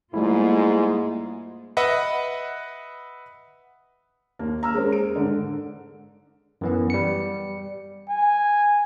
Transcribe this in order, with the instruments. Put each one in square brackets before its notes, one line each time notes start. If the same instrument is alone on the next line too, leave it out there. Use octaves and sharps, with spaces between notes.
[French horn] G#2 [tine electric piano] G3 A3 E4 [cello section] A#3 F4 G#4
[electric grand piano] B4 D#5 E5 F#5
[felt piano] D#2 A#3
A#5 E6 F6
G#3 C#4 A#4 C5
D7
G#2 D3
[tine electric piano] F#2 E3 B3
G3 C#7
[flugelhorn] G#5